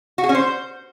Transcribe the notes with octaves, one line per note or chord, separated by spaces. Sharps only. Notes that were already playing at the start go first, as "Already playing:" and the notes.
F#4
G#4
C#4
C5